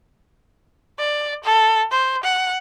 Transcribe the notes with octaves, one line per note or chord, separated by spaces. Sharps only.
D5
A4
C5
F#5